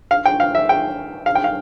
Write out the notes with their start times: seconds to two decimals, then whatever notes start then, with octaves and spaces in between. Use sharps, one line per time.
0.11 F5
0.25 G5
0.40 F5
0.55 E5
0.69 G5
1.26 F5
1.35 G5
1.44 F5